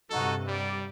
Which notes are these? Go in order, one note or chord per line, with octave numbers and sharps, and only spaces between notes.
G2 C3 D#4 F#4 A4
G3 D5